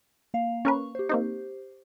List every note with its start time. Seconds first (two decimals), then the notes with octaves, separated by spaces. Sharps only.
0.34 A#3 F5
0.65 C#4 A#4 B4 C#6
0.95 G4 C5
1.09 A#3 C4 D#4